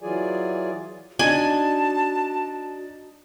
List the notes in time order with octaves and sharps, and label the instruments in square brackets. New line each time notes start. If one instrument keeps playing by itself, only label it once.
[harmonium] E3 F#3 F4 G#4 D5 G#5
[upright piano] D4 D#4 [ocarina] F#4 [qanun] G#5 [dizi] A5